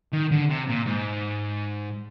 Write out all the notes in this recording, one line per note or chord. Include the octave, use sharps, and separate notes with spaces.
D#3
D3
C3
A#2
G#2